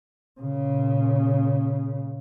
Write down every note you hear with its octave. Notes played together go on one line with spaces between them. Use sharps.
A#2 C#3